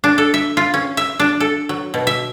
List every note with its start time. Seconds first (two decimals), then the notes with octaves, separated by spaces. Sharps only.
0.04 D4
0.18 A4
0.34 E5
0.57 F4
0.74 C#4
0.97 E5
1.19 D4
1.40 A4
1.69 F#3
1.94 B2
2.07 E5